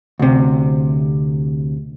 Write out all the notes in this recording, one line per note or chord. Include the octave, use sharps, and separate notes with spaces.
D2 C3